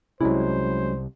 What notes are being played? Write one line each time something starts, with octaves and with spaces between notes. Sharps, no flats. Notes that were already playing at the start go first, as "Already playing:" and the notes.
C2 C3 F#3 G#3 C#4 E4 C5